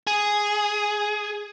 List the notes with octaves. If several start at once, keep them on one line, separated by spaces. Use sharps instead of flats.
G#4